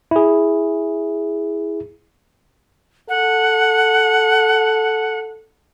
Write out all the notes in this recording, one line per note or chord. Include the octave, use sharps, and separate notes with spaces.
E4 G#4
A4 F#5